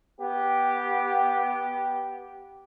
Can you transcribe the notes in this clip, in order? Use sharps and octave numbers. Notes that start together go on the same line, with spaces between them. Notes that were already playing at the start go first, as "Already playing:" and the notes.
B3 G4